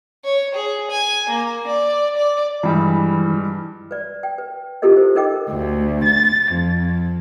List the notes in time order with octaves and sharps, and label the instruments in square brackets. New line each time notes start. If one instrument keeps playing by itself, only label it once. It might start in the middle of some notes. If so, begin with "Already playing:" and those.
[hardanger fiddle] C#5
G#4
G#5
A#3
D5
D5
[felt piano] G2 G3 G#3 [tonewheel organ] E3
[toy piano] B4 D5
G5
B4
E4 F4 G4 A4 A#4 D#5
C5
D#4 A4 A#4 D#5 G5 D6
[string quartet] D2
A6
F2